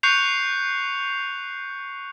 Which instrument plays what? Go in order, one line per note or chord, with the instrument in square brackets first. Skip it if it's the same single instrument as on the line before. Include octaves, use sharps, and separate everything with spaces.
[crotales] C#6 F#6 G6 C7 C#7 F7